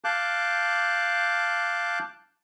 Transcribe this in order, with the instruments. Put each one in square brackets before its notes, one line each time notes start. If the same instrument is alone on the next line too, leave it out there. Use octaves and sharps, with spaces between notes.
[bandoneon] F5 A5 D6 F#6 G6